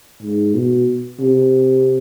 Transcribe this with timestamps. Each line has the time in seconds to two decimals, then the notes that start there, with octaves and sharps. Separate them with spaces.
0.23 G#2
0.55 B2
1.20 C3